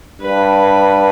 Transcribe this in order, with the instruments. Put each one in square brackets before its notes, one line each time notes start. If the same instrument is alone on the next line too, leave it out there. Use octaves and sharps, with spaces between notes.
[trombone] G2 [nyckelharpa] B4